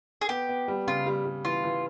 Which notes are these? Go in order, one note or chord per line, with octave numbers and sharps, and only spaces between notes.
G#4
B3 G4
B3
G3
C#3 F4
G3
G3
E3 F4
E3